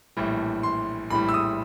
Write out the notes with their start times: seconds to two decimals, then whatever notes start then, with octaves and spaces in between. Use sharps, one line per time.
0.17 A#1 A2 E3 G3
0.63 C6
1.10 A#1 A2 E3 G3 B5
1.29 E6
1.34 D#6